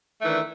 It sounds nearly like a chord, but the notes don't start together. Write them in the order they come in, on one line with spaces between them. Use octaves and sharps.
A3 D#3 E3 D4